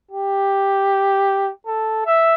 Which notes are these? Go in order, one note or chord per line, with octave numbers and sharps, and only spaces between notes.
G4
A4
E5